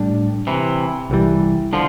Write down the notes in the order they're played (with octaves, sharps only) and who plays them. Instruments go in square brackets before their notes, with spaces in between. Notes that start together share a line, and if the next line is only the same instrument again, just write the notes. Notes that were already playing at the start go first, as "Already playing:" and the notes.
Already playing: [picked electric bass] A2 G3 D4
[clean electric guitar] C3 E3
[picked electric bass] C2 C3 E3 G3
[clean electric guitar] D3 F3